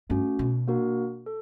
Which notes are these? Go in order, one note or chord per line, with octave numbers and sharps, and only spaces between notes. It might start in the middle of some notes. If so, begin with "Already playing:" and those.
G2 A3 C#4 F#4
B2
A#3 D4 F#4 A#4
A4